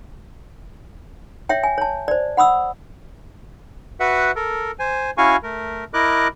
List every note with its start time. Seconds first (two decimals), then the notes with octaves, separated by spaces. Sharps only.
1.49 C#5 E5 G5
1.63 G#5
1.78 C#5 A5
2.08 C5 D5
2.37 F#5 B5 D#6 E6
4.00 F#4 B4 E5 F#5
4.36 A4 A#4
4.79 C5 G#5
5.18 C#4 E4 F#4 F5 G#5 C#6
5.43 A3 A#4
5.94 E4 A#4 D#5 D6 F#6